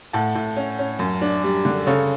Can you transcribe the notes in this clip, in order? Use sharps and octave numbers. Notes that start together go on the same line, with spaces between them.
A2 F#5 A5
A2
C#4
C#4
F#2
D4
G3
D3
C#3 A4 C#5